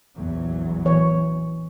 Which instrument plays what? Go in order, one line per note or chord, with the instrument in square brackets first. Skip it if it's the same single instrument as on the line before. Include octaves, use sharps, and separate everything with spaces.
[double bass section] A#1 E2 F#3
[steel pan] E3 C#5